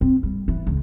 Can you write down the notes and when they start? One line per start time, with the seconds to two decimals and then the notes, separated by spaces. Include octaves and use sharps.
0.01 C4
0.23 G3
0.48 E3
0.67 C#2